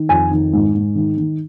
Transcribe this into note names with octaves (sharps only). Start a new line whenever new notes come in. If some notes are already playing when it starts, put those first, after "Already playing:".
Already playing: D#3
F2 G#5
D#3
G#2
G#2
D#3
D#3